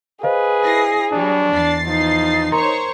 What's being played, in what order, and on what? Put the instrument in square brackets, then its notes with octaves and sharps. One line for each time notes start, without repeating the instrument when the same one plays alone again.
[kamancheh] G#4 [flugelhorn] B4 [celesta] C5 D#5 F5
[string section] E4 A#6 C7
[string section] F#3 G3 [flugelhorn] D4
[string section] E2 A6 C7
[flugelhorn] F3 [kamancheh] D#4
[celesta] A#4 A#5 C6 [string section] C5 C#5 C#6